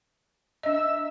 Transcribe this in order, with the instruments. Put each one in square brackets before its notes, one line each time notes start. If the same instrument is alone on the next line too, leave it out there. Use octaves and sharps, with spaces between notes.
[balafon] D4 D#5 [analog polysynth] E5 E6